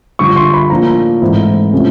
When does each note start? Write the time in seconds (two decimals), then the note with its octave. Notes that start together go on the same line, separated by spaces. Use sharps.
0.19 G2 D3 F3 C#6
0.36 C6
0.54 B5
0.70 A2 F3 A#3 D4 A#5
1.21 G#2 E3 A3 C4 E4
1.73 C3 F3 A3 C#4